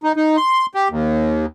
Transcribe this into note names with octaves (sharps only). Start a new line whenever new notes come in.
D#4
D#4
C6
G4
D#2